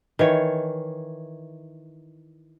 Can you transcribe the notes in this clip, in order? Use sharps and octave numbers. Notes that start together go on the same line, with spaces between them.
D#3 E3 C#5